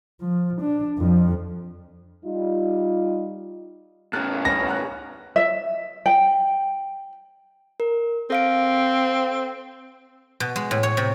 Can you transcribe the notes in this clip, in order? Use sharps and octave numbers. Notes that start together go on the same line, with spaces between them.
F3
D4
F2 F3
G3 D#4 F4
A2 C#3 A#4 G5 F6 F#6 A6
G2 B3 C#4 B4 G5 A#6
F#5 A#5 F#6
E5
G5
A#4
C4 A4 F5 D7
B2
G#3
A2
C#5
C3